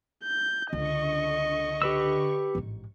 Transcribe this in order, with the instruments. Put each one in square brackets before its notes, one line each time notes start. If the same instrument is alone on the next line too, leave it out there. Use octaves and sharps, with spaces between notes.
[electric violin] G6
[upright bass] C#2 [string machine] D3 C#6 [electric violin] D#5
[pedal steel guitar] G4 B4 E6
[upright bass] A1 G#2